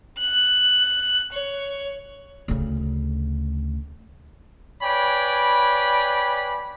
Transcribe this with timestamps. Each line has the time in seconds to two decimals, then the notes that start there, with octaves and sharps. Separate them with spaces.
0.18 F#6
1.32 C#5
2.48 D2 C#3
4.83 B4 C#5 D5 G5 G#5 B5